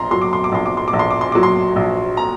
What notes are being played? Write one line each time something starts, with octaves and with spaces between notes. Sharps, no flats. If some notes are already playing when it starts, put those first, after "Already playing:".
Already playing: A#1 A#5 C6
F#3 C6
D6
C6
D6
A#1 C6
D6
C6
D6
A#1
C6
D6
C6
F#3 D6
C6
A#1
A#5